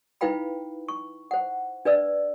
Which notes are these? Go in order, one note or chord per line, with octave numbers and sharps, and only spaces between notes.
D#4 E4 B4 F5 G5 B5
C#6
C5 F#5
D4 B4 D5 E6